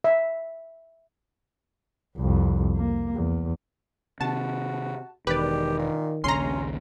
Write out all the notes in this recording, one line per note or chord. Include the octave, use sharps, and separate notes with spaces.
E5
C2 F2
A#3
E2
C3 D#3 F#4 A5
E1 D#3 G4 B4 D5
A#2
A#1 D#2 C#3 C#4 A#5 C6